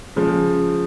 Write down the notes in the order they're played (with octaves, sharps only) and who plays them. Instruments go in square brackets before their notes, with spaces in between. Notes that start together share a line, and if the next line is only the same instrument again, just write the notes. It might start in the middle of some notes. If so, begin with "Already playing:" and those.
[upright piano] C#3 F3 G#3